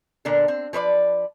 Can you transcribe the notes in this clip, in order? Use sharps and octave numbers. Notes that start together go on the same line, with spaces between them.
A#2 D3 D4 A#4
C4
F3 B4 C#5 D5